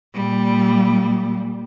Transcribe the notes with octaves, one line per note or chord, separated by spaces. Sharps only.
A#2 G3